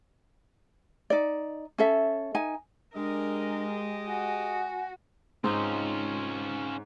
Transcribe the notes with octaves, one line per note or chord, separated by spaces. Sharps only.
D#4 D5
C#4 A4 E5
D#4 G#5
G#3 D4 G4 G#4 A#4 D#5
F#4 G#5
G#2 C4 C#4 D#4 F4 C5